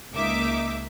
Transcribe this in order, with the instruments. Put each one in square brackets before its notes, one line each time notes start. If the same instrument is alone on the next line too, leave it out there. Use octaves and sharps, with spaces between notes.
[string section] C#2 A#3 D#4 E5 D6